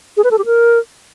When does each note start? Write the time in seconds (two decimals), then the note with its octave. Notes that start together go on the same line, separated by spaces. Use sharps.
0.17 G#4
0.24 B4
0.31 A4
0.38 G4
0.45 A#4